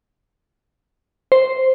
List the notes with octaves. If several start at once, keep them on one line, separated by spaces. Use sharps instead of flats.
C5